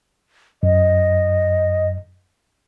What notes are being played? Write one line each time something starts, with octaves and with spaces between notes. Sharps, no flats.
F#2 D#5